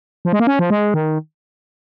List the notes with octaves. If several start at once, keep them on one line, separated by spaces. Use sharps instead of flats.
F3
G#3
A#3
C#4
F3
G#3
D#3